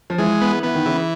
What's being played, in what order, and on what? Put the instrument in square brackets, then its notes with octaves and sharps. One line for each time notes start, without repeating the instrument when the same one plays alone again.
[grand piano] F3
[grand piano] E3 [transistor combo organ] G#3
[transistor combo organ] B3
[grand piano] E3 [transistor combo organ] B3
[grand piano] D#3
[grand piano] C#3 [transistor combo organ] E3